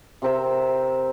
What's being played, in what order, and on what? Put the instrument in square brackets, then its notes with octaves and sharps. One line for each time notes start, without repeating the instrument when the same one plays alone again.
[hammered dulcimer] C3 C4 A#4 E5